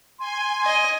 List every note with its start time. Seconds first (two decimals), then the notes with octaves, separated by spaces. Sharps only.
0.19 G#5 C6
0.65 D#5